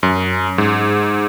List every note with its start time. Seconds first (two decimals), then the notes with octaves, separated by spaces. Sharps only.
0.03 F#2
0.58 G#2